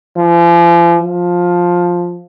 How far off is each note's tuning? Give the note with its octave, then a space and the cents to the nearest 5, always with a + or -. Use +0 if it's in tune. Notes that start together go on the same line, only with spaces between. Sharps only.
F3 -40
F3 +10